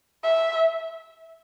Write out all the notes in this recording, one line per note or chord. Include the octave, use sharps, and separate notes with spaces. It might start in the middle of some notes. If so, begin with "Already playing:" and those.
E5